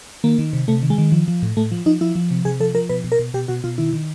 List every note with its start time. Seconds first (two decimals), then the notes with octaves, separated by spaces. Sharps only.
0.24 D#3 A#3
0.39 D#3
0.53 C3
0.68 C3 A3
0.83 D#3
0.90 G#3
0.98 D#3
1.12 F3
1.28 F3
1.43 A2
1.57 A2 A3
1.72 F3
1.86 F3 D#4
2.01 F3 E4
2.15 F3
2.31 C3
2.45 C3 G#4
2.60 F3 A4
2.75 F3 A#4
2.89 B2 B4
3.04 B2
3.12 A#4
3.19 B2
3.34 B2 G4
3.48 B2 F#4
3.64 B2 F4
3.78 D#3 E4
3.93 D#3